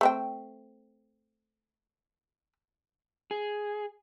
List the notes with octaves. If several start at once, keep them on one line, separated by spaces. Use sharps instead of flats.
A3 C4 G5
G#4